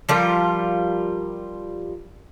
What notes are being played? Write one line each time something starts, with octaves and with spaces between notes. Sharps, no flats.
F3 G3 F4 A#4